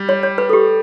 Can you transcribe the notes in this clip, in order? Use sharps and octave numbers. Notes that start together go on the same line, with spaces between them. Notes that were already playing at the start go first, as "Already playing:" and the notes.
Already playing: G3
C#5
C#5
B4
A4
G4